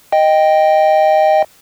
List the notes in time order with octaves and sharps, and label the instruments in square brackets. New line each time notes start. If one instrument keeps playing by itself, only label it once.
[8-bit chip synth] D#5 G5